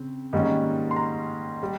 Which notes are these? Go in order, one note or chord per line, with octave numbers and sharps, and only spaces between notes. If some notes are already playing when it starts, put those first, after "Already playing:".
Already playing: C#3 C4
G#2 D#3 G3 A#3 C#4
C6
A#5
G3